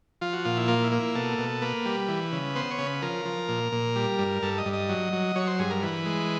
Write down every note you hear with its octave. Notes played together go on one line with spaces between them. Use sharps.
F3 F4
F#4
A#2 F4
E4
A#3 F4
E4
A#3
E4
B2 A4
B2
A#3 B4
G3
E3
C#3
B3 C5
C#5
C#3
B4
F3 A#4
F3
A#2
A#2
G3
G2
G2 A4
D#5
G2
D#5
F#3
F#3
F#3 C#5
C5
G2 G#4
A#4
E3 B4
G#3